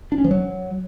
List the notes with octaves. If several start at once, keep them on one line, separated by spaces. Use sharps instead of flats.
D4
C#4
F3
F#3